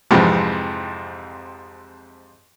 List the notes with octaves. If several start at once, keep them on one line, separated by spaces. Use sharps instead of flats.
F2 G#2 C3 E3 F3